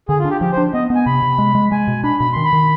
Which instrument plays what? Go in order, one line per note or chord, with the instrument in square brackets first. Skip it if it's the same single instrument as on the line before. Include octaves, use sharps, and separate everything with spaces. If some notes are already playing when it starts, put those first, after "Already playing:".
[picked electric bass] D3 [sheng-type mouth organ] G#4
[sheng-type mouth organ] F4
[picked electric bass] D4
[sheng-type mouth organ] G4
[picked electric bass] F3 [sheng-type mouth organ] G4
[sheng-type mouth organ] C5
[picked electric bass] D4
[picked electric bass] B3 [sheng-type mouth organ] D#5
[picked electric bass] B3
[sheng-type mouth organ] G#5
[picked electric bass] C3 [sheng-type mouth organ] B5
[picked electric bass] C3
G#3
G#3
[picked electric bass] G#3 [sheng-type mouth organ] G#5
[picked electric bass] B2
[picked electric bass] D4 [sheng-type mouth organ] B5
[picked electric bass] B2 [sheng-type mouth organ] B5
[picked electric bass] D#3 [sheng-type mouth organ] C6
[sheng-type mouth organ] B5
[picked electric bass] D#3